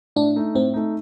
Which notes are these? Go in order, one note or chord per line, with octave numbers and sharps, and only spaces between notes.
A2 D4
A3 D#4
A2 C4
A3 D#4